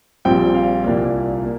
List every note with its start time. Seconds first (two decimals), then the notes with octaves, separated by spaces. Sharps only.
0.25 A#1 A#2 G3 C4 G5
0.54 F5
0.84 C2 A#2 A#3 D5
1.43 A#3